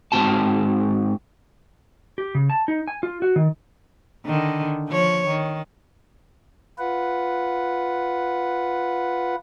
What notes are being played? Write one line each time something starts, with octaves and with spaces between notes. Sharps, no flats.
G#2 E3 C4 F#4 A5
G4
C#3
A5
D#4
G#5
F4
F#4
D#3
D3 D#3
F3 C#5
D#3
F4 B4 F#5